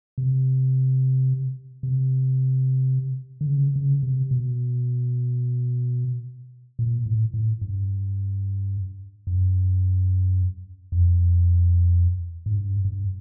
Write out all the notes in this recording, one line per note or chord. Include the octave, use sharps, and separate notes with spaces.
C3
C3
D3
C#3
C#3
C3
B2
A#2
A2
A2
G2
F#2
F2
G#2
G2
G2